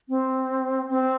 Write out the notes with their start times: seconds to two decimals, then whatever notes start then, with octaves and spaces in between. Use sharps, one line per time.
0.09 C4
0.89 C4